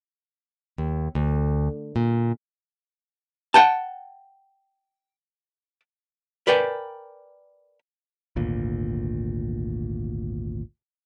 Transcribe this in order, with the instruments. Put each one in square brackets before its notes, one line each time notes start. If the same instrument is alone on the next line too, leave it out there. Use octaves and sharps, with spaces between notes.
[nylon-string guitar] D#2
D2
A#2
[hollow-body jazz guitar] F#5 G5 A5
A#4 B4 D5 G5 G#5 A#5
[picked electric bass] G#1 D2 A#2